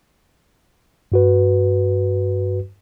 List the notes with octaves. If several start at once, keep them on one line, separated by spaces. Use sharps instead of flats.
G2 F#4 B4